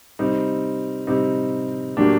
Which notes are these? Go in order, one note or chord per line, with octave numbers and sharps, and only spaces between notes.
C3 G3 C4 D#4
C3 G3 C4 D#4
A2 F#3 A#3 D4 G4